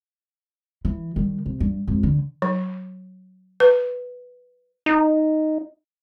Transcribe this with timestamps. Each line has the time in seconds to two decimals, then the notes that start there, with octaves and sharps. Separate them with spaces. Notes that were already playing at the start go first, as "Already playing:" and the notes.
0.85 E3
1.16 D#3 G3
1.46 C3
1.60 G2
1.88 F2 G#2
2.03 D3
2.42 F#3
3.60 B4
4.86 D#4